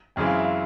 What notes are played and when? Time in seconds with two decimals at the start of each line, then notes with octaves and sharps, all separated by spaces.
0.16 F#2 C#3 E3 G#3 C4 G5
0.26 F5
0.35 E5
0.45 F5